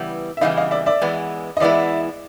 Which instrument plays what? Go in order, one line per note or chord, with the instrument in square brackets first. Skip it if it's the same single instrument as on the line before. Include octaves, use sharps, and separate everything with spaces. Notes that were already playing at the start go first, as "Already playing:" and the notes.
Already playing: [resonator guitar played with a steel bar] C#3 E3 G3 B3 E4
[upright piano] E5
[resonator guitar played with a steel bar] C#3 E3 G3 B3 E4 [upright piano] D#5 F5
[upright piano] D#5 F5
D5 E5
D5 E5
[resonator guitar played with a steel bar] E3 G#3 B3 E4
[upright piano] D#5
[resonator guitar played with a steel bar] E3 G#3 B3 E4 [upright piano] D5 E5